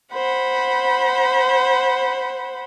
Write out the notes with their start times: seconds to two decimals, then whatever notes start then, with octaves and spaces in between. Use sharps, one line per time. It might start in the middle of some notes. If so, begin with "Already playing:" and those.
0.14 C5 F#5 B5